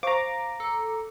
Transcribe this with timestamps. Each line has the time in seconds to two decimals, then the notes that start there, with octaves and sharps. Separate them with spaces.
0.03 C5 F5 A#5 C#6 D6
0.60 A4